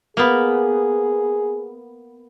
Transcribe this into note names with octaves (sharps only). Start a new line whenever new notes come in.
A#3 B3 G#4